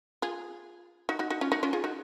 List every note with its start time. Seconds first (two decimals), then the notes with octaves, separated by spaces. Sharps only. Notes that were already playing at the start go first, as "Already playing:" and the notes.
0.22 F4 G#4
1.09 D#4 F#4
1.19 D#4 F#4
1.30 D#4 F#4
1.41 C#4 F4
1.52 D#4 F#4
1.63 C#4 F4
1.73 F4 G#4
1.84 D#4 F#4